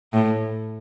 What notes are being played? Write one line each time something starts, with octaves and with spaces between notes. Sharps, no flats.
A2